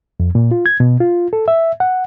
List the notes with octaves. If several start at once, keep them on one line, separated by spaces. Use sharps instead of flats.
F2
A#2
F4
G#6
B2
F4
A4
E5
F#5